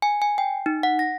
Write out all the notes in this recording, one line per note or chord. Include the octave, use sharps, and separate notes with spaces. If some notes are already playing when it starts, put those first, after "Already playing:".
G#5
G#5
G5
D#4
F#5
A#6